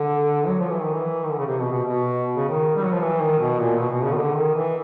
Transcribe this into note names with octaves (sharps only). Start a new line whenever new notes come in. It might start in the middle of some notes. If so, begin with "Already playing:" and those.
Already playing: D3
F#3
F3
E3
D#3
E3
D#3
D3
C#3
C3
B2
B2
B2
C#3
D#3
G3
F#3
F3
E3
D#3
B2
A#2
B2
B2
C#3
D#3
D3
D#3
E3